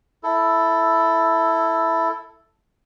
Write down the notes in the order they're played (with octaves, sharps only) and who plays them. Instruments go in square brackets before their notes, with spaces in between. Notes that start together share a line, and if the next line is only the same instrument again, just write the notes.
[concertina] E4 A4